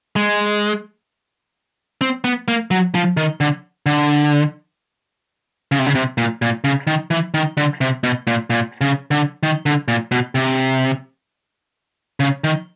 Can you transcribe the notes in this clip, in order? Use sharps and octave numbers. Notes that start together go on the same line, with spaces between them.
G#3
C4
B3
A#3
F#3
F3
D#3
D3
D3
C#3
C3
C#3
C3
A#2
A#2
C#3
D#3
E3
D#3
D3
C3
B2
A#2
A#2
C#3
D3
D#3
D3
A#2
B2
C3
C#3
D#3